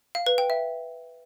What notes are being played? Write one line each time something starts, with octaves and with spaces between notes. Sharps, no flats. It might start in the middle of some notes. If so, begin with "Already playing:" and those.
F5
B4
G5
E5